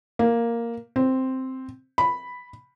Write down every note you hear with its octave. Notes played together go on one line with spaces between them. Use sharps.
A#3
C4
B5